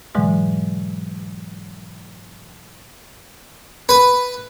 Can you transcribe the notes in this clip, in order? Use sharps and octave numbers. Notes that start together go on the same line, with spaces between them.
G#2 B2 D3 E3 F#3 G#3
B4